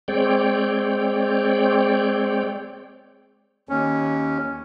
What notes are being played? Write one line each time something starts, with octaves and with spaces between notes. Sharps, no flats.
G#3 C4 C#5 D5 G5
D#2 C#4